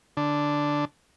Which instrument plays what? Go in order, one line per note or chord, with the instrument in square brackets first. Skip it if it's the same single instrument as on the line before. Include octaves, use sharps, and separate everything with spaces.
[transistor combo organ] D3 D4